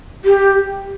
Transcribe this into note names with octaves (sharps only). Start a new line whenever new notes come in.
G4